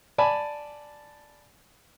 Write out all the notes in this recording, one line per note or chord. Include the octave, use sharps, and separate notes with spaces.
D5 G#5 A5 B5